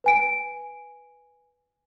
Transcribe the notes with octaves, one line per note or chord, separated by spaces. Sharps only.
B4 G#5 D7